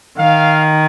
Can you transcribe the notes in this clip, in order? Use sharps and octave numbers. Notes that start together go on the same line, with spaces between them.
D#3 F5